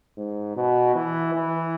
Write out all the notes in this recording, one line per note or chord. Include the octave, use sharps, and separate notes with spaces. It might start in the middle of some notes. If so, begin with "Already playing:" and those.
G#2
B2
E3
E3